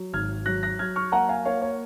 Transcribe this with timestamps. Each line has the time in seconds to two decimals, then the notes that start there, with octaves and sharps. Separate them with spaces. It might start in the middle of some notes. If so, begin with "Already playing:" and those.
Already playing: F#3
0.13 G#1 F6 G#6
0.46 F#3 F#6 A#6
0.63 F#6 A#6
0.79 F#3 F6 G#6
0.96 C#6 F6
1.12 A#3 F#5 A#5
1.29 F5 G#5
1.45 A#3 C#5 F5
1.62 C#5